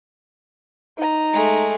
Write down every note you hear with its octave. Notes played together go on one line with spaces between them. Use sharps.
D#4 A#5
G#3 A3